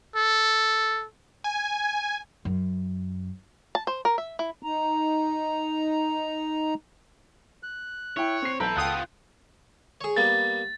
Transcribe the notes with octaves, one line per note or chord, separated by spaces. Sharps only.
A4
G#5
F#2
A5
C5
A#4
E5
E4
D#4 A#5
F#6
E4 C#5 G5
C4 C7
B1 E4 A4 B4 A#5 G6 D7
C#2 B3 F4 G5 D#6 F#6
G#4 C#5
G3 A#3 B3 A6